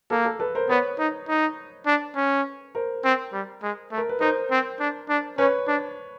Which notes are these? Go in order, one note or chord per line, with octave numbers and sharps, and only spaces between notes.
A#3 A4
A4
A4 B4
A#4 C5
B3 B4 C#5
D#4
D#4
D4
C#4
A#4 C5
C4
G3
G#3
A3
A#4
B4
D#4 A#4 C5
C4
D4
D4
C#4 B4 C#5
D4